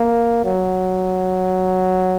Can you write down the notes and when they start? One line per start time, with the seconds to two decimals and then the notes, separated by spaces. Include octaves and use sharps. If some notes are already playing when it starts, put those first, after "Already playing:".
Already playing: A#3
0.45 F#3